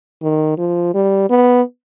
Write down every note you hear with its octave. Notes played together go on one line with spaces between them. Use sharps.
D#3
F3
G3
B3